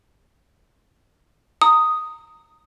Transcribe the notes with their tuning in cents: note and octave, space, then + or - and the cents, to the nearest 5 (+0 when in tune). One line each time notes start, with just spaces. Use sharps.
A#5 -20 D#6 +0